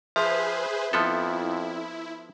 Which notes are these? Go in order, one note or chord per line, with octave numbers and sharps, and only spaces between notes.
F3 G#4 B4 C5 E5
F2 F3 B3 E4 A4